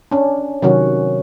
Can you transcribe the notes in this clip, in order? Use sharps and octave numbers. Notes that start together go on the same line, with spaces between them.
C#4 D4
C3 D#3 F#3 C#4 F#4